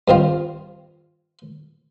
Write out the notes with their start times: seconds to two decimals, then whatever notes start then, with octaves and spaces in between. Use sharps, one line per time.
0.08 G2 D#3 C4 F4